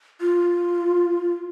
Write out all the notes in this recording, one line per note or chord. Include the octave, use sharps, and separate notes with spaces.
F4